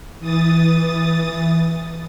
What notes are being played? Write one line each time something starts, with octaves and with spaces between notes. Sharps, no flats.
E3 D#6 A6